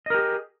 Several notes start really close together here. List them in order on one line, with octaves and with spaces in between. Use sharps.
D#5 A#4 G4 G#4